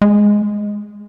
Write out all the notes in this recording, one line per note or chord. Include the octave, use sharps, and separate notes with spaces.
G#3